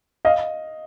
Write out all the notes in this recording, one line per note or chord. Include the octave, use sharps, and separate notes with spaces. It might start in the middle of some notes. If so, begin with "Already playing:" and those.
D#5 F5